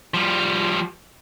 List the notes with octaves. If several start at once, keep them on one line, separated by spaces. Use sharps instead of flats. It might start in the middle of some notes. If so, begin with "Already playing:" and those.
F3 G3